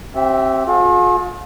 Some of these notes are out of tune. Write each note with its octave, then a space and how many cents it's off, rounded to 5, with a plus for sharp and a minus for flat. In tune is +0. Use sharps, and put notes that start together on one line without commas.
C4 +25 G4 -30 E5 +0
F4 +45 G#4 +40